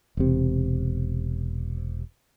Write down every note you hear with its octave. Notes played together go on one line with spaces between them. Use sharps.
E1 C3